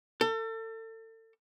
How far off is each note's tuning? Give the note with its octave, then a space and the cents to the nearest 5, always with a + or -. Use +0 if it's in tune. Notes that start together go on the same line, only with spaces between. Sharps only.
A4 +35